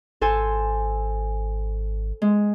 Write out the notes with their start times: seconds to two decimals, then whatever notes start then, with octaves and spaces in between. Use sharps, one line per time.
0.21 G#1 A4 C5 G#5
2.22 G#3